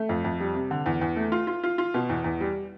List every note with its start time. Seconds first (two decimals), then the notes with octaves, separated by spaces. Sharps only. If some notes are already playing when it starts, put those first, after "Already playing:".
Already playing: A3
0.09 F2
0.24 F2
0.40 G3
0.55 C3
0.71 D3
0.86 E2
1.01 E2
1.16 A3
1.32 F4
1.47 F4
1.63 F4
1.78 F4
1.94 B2
2.09 E2
2.24 E2
2.41 G3